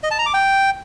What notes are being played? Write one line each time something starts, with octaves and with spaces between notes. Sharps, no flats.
D#5
A5
A#5
D6
G5